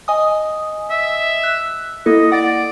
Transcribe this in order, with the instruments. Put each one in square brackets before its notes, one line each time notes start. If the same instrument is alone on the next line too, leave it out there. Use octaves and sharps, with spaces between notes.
[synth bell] D#5 G#5 D#6
[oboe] E5
[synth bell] F#6
[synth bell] A#3 E4 A4 [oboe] D#5
[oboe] D5 [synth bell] F#5 A6